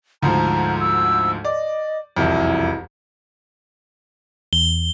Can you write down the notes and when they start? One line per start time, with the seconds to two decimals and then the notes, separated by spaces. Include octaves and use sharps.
0.23 D2 G#2 F3 A#5
0.80 E6
1.45 D5 D#5
2.17 E1 C2 F2 E4
4.53 E2 G7